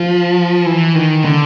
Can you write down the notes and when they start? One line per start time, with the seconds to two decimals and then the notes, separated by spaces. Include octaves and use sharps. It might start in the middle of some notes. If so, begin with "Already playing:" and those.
Already playing: F3
0.66 E3
0.95 D#3
1.25 D3